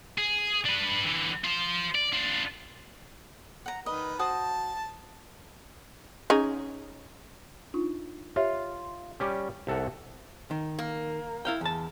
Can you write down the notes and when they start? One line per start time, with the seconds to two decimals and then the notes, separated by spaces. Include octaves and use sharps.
0.18 G#4
0.65 D4 B4
1.04 D3 E3
1.44 F4 C5
1.95 D5
2.12 D4 F4
3.66 F#5 A#5
3.86 D#3 B4 D#5
4.19 F#4 C5 A5 D#6
6.30 C#4 D#4 G#4
7.74 D4 D#4 F4
8.36 F4 G4 C#5 E5
9.20 G3 C#4 G4 D6
9.67 C2 A4 F#5
10.51 D#3
10.79 A#3
11.45 E4 F5 G5
11.61 E2 A5